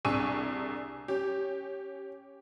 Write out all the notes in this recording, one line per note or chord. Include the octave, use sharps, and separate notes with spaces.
C2 D4 G#4 C#6 E6 D#7
C#4 G4